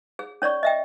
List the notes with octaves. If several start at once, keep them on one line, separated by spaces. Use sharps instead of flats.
G#4
C#4 C#5 D5 C#6
D#5 E5 G5